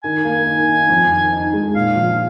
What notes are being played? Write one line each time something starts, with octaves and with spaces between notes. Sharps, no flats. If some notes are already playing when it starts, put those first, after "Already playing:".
D#3 G#5
A#3
D#3
D#4
F2
D#3
D#4
G#3
A#2 F5
F3